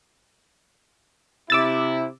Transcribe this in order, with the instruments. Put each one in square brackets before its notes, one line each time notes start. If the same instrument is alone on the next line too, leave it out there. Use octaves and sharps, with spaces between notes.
[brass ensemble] C3 E4 [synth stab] D6 E6 A6